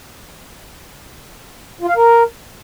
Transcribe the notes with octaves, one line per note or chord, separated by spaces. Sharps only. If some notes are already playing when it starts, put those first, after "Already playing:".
F4
F5
A#4